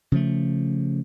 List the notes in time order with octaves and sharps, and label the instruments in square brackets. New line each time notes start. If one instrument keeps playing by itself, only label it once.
[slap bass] C#3 F3 A3